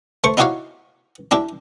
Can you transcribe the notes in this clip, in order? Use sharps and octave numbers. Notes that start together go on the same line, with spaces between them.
A3 C5 C#6
D#4 E4 F#4 G4 C#5 F5
D4 E4 G4